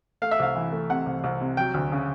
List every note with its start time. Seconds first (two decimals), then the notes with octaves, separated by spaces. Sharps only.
0.22 A3 F5
0.31 E5
0.39 C2 F5
0.55 E3
0.72 A3
0.90 C3 F#5
1.06 C2
1.24 C2
1.41 C3
1.57 F#3 G5
1.74 D2
1.92 C#3